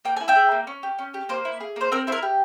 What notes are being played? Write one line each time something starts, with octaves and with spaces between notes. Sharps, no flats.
A#3 G5
E4 G#5
E5 G5
G#4
A#3
C#4
G4
C#4
G4
A#3 C5
E4
G#4
A#3 C5
C4 A#4
E4 C5
A#4
G4